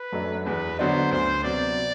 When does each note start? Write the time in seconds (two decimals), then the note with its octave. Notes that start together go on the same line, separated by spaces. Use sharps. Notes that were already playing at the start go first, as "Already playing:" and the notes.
Already playing: B4
0.12 F#2 F#3 A3 D4
0.45 E2 B4
0.79 D3 F#3 B3 D4 C5
1.11 D2 C5
1.44 C3 F#3 B3 D5